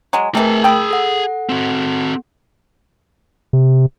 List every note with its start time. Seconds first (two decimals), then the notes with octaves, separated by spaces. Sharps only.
0.13 F#3 G#3
0.35 C3 E3 A3 G#4 A#4 A5
0.64 G5 B5 D#6 E6
0.91 A4 F#5
1.49 C4 F#4
3.53 C3